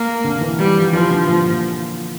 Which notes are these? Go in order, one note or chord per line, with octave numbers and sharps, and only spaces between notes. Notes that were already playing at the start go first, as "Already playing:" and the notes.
Already playing: A#3
D3
E3
E3 G3
F3
E3 F3
D3
A#2 F3